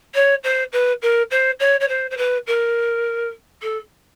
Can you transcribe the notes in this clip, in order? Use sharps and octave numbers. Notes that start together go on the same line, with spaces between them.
C#5
C5
B4
A#4
C5
C#5
C#5
C5
C5
B4
A#4
A4